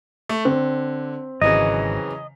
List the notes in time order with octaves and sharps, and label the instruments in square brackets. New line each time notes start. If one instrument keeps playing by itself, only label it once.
[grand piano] A3
[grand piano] D3 [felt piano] C4
[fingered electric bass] G#1 [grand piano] C#3 E3 F#3 [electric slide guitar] D#5